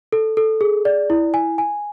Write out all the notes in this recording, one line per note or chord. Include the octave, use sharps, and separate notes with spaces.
A4
A4
G#4
D5
E4
G#5
G#5